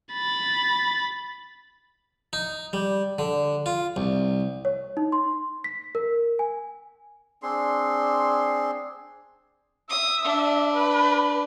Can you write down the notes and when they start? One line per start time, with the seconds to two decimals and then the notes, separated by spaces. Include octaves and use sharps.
0.14 B5 A6
2.33 D#4
2.73 G3
3.19 D3
3.66 F4
3.96 C2
4.65 C#5
4.97 D#4
5.12 C6
5.64 B6
5.95 A#4
6.39 G#5
7.43 C4 D4 G#4 C6
9.90 E5 D#6
10.25 D4
10.73 B4